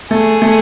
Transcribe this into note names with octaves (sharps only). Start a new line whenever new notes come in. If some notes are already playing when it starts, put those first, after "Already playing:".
A3 G#4
A3